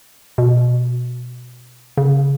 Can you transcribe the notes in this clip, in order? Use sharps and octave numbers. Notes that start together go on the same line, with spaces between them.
B2
C#3